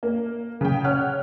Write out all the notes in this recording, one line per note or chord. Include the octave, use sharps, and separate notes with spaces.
A#3
C#3 G5
C#5 F#5 F6 F#6